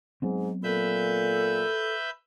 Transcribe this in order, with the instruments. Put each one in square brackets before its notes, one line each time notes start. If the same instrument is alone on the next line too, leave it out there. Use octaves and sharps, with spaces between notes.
[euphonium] G#2 [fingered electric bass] F#3 B3 C4
[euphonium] A#2 [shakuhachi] A4 [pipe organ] B4 E5 G6